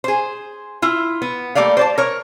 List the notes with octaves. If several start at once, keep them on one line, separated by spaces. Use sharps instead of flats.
G#4 C5
E4 F4
B3
G3 A3 A#3 D5 F5
C5 D5 A5
A#4 C#5